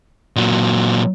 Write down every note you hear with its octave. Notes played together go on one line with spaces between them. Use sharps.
A#2 F#3